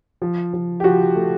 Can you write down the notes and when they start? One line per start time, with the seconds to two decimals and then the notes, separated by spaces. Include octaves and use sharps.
0.22 F3
0.54 F3
0.80 G4
0.84 F3 F#4
1.16 A3